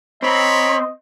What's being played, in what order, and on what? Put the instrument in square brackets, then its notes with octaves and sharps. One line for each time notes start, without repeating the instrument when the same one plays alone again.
[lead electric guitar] C4 [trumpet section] C#5 A#5 B5 [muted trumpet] D#5